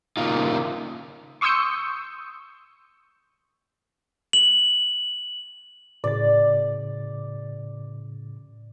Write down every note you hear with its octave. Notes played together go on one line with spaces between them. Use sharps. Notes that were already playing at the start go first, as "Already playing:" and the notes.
C#3 A#3 D#4 F4
C6 C#6 D#6 E6 G6 C#7
F#7
A2 C#3 D5 A6